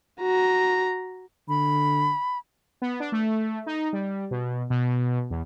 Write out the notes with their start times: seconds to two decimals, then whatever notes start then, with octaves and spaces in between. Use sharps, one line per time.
0.21 F#4 A#5
1.49 D3 B5
2.82 B3
3.00 D4
3.12 A3
3.66 D#4
3.93 G3
4.31 B2
4.70 B2
5.30 E2